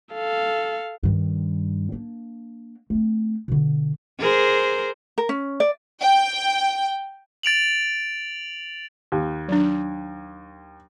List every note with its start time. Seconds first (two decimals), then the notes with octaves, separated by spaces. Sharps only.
0.14 A4 F5
1.03 G2 D#3
1.92 A#3 D4
2.90 A3 C4
3.48 B2 D3
4.19 G#4 A#4 C5
5.18 A#4
5.29 C#4
5.60 D5
6.02 G5
7.43 A6 D7 F7 F#7
9.12 D#2
9.49 F#3 D4